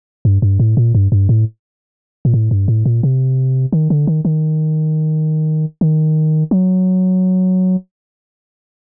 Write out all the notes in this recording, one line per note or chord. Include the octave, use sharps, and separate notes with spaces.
G2
G2
A2
A#2
G2
G2
A2
A#2
A2
G2
A2
A#2
C3
D#3
D3
D#3
D#3
D#3
F#3